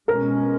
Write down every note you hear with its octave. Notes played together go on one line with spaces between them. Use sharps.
B2 G#3 C#4 A#4